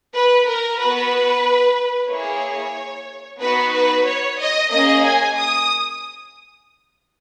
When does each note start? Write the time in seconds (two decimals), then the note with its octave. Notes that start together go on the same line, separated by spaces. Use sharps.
0.15 B4
0.48 A#4
0.80 B3 F#4 B4
2.10 A#3 E4 G#4 C#5
3.41 B3 D#4 F#4 B4
3.74 B4
4.06 C#5
4.39 D#5
4.71 A#3 C#4 G#4 D#5
5.04 G#5
5.37 D#6